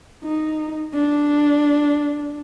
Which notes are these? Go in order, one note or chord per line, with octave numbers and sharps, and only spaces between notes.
D#4
D4